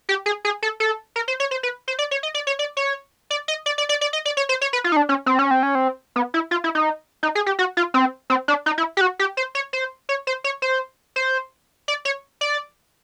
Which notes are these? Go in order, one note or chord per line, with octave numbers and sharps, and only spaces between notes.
G4
G#4
G#4
A4
A4
A#4
C5
C#5
C5
B4
C5
D5
C#5
D#5
D5
C#5
D5
C#5
D5
D#5
D5
D5
D5
D5
D#5
D5
C#5
C5
C#5
B4
F4
D#4
D4
C#4
C4
C#4
C4
C#4
C4
B3
E4
F4
E4
D#4
D#4
G#4
G4
F#4
F4
C4
C4
D4
D#4
E4
G4
F#4
G4
C5
C#5
C5
C#5
C5
C#5
C5
C5
D5
C#5
D5